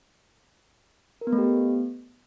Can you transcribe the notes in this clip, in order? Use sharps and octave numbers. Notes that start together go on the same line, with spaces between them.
A#4
B3
A3
G4
B3